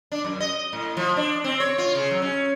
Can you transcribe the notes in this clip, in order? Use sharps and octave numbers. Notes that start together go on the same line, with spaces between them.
D4
F#2
D#5
A2
F3
D4
C4
C#5
F4
C#3
F#3
C#4